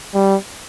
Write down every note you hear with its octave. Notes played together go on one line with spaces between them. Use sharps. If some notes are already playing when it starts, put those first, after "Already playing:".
G3